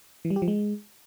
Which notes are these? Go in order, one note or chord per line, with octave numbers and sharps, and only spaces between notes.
E3
G3
G4
F3
G#3